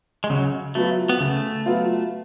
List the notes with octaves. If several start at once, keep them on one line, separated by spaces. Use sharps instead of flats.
G#3
C#3 F#3
F#3 A3 B3 F4
B3
C#3 A3
F#3 B3 F4